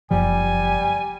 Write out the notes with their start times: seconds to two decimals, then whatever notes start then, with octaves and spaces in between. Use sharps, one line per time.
0.11 F#1 F3 G3 G#5